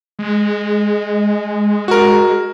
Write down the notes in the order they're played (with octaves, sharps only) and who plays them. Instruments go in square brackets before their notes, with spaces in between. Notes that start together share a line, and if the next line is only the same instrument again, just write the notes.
[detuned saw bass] G#3
[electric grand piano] F#4 A#4